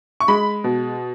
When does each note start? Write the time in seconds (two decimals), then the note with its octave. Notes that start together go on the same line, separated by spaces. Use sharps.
0.20 C#6
0.28 G#3 B5
0.64 B2